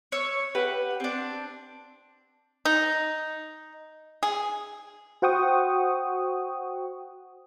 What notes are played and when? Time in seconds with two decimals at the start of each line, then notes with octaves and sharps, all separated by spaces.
0.12 C#5 E6
0.55 G4 B4 F#5
1.00 C4 D4
2.65 D#4
4.23 G#4
5.22 F#4 C5 F#5 G5 C#6 D#6